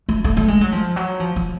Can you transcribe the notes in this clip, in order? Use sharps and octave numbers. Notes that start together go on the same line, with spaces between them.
A3
A3
A3
G#3
F#3
F3
F#3
F3
F3